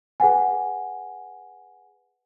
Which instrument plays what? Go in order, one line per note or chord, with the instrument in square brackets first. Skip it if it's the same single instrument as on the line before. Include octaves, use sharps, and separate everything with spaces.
[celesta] G#4 B4 F#5 G#5